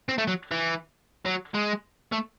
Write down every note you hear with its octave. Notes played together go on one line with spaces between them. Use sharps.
C4
A3
F#3
E3
F#3
G#3
A3